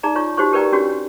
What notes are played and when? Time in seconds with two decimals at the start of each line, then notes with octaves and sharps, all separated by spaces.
0.03 D#4 G#4 D5 A#5
0.15 D#4 F4 C#5 C#6
0.37 D#4 F#4 G4 C5 C#5 C#6
0.53 G4 A#4 B4 D5 G5 A#5
0.72 C#4 D4 F#4 G4 C#5